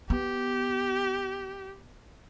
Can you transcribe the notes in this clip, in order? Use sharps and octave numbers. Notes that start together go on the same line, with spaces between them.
B3 G4